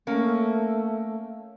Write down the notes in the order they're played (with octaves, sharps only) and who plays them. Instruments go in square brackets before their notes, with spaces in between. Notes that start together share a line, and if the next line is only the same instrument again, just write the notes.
[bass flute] A3 [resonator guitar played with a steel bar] A#3 C#4